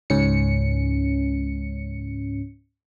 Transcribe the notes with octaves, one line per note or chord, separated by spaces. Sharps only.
C#2 G#2 C#4 C#7